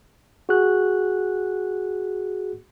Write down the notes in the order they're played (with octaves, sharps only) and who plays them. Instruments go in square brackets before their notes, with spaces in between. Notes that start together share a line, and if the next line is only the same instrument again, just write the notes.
[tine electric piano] F#4 G#4 F#6